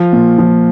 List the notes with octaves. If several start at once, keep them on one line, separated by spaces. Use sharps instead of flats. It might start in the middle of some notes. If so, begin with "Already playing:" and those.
Already playing: F3
A#2
F3